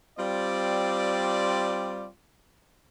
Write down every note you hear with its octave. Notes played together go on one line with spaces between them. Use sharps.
G3 C4 F4 D5